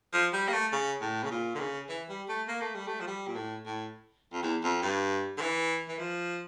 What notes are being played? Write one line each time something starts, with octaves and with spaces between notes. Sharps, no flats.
F3
G3
A#3
A3
C#3
A2
C#3
A#2
D3
C#3
E3
G3
A3
A#3
A3
G3
A3
F3
G3
A#2
A2
A2
F2
E2
F2
G2
D3
E3
E3
F3